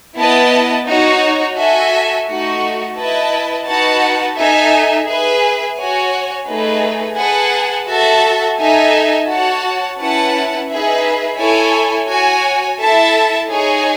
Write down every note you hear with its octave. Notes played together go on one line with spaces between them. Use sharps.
B3 E4 B4 D#5 A5
D#4 F#4 C#5
F#4 A4 E5 G#5
A3 D#4 F#4
E4 B4 D#5 A5
D#4 F#4 B4 F#5 A5
D#4 A4 E5 G#5
G#4 B4 E5
F#4 C#5 G#5
A3 D#4 G#4 B4
G#4 B4 F#5 A5
F#4 A4 E5 A5
D#4 A4 E5 G#5
F#4 C#5 F#5 A5
C#4 E4 B4 F#5 A5
D#4 G#4 B4 E5
E4 A4 C#5 G#5
F#4 C#5 G#5
E4 A4 E5 A5
D#4 G#4 C#5 G#5